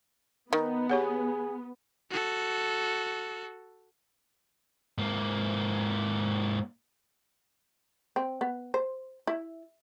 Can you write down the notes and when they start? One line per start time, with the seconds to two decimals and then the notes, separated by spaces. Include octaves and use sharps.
0.53 D#3 B3 D#4
0.90 G4 G#4 C#5 F#5
2.11 F#4 A4
4.98 G#2 A#3
8.16 C4
8.41 B3
8.74 C5
9.27 E4